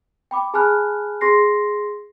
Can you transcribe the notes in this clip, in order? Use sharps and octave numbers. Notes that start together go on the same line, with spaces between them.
G5 B5 D6
G#4 G#5 A5 B5 F6 F#6
G#4 C6 A#6 C7